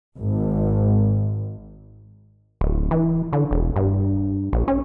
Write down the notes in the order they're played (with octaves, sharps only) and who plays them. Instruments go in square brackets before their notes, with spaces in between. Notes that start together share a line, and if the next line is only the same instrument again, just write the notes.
[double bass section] G#1
[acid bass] D1
E3
D3
E1
G2
A#1
C#4